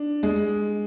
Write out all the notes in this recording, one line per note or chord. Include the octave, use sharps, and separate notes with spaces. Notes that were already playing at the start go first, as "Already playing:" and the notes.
Already playing: D4
G#3